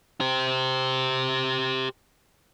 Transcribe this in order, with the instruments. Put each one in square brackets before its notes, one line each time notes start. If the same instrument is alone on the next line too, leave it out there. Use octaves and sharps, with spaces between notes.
[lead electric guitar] G4 C5